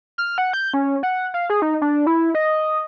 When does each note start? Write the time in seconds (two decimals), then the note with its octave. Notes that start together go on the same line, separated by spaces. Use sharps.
0.18 F6
0.38 F#5
0.53 G6
0.74 C#4
1.03 F#5
1.34 F5
1.50 G#4
1.62 D#4
1.81 D4
2.07 E4
2.35 D#5